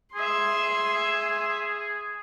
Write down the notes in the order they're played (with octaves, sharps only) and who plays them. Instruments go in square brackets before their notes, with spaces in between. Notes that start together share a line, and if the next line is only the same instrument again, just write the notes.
[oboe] G#4 [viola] E5 C6